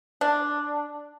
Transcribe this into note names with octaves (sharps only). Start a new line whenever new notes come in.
D4